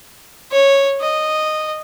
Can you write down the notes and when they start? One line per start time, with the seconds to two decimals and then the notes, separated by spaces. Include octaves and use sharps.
0.51 C#5
1.01 D#5